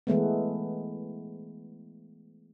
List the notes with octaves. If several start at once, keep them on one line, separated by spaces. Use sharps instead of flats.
E3 G#3 A3 B3